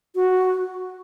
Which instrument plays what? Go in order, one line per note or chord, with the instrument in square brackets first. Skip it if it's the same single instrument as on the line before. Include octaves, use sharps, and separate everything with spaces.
[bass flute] F#4